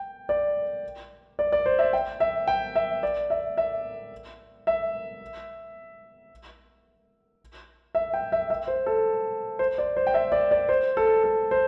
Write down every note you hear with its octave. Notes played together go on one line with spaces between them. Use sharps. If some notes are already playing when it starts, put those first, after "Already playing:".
Already playing: G5
D5
D5
D5
C5
E5
G5
E5
G5
E5
D5
E5
E5
E5
E5
G5
E5
E5
C5
A4
C5
D5
C5
G5
E5
D5
D5
C5
A4
A4
C5